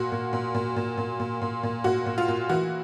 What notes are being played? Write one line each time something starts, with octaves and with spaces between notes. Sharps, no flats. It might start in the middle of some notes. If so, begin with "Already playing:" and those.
Already playing: A#2 F#4
A#2
A#2
A#2
A#2
A#2
A#2
A#2
A#2
A#2 F#4
A#2
F4
A#2
E3 F#4